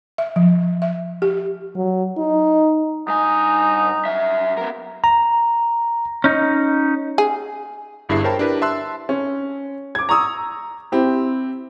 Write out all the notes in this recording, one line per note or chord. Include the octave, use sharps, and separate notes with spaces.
E5
F3
E5
G4
F#3
D#4
G2 D#4 G#5
F#2 E5
B3 A#4
A#5
C#4 D#4
G#4
G1 G2 E4 G#4 E5 C7
A#4 C5 C#5 G5 A5 B5
D4 E4 G4 A#4 B4
E5 A5 C6 E6 F#6
C#4
D6 G#6
A#5 C#6 D#6 E6
C4 E4 G4